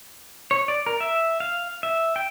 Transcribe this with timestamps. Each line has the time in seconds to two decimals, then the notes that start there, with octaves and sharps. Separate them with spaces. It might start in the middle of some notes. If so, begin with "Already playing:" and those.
0.51 C#5
0.68 D5
0.86 A#4
1.00 E5
1.40 F5
1.83 E5
2.16 G5